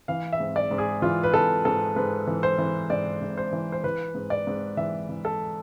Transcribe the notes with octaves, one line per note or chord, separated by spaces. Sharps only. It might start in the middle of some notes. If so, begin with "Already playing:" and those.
E3 F5
E5
G#2
D5
G#2
G#4
E3 F4
B4
E3 A4
G#2 A4
G#2 B4
E3
C5
E3
G#2 D5
G#2
C5
E3
C5
E3 B4
G#2
D5
G#2
E3 E5
E3
A4